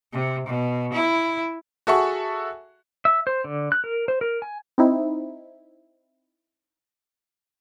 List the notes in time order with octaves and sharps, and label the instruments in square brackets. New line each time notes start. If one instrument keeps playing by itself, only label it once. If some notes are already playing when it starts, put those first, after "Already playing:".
[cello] C3
B2
E4
[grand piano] F#4 G#4 A4 E5 F#5 C#6
[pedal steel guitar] E5
C5
D3
F#6
A#4
C5
A#4
G#5
[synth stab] C4 D#4 E4